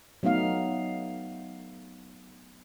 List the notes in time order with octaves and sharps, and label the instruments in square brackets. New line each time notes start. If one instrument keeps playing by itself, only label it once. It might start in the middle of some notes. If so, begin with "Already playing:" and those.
[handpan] F#3 A3 B3 D#4 F5